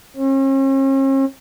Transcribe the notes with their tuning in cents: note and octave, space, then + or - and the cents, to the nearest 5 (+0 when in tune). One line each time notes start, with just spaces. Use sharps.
C#4 -45